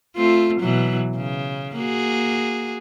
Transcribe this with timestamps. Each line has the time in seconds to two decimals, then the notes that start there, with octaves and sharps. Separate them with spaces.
0.17 A3 C4 F4
0.60 B2 E3 F#3
1.16 C#3
1.76 A#3 F#4 G#4